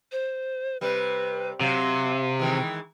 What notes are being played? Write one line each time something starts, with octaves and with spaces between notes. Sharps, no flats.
C5
C3 G3 B4
C3 F#3 F5
D#3 E3 G#3 G5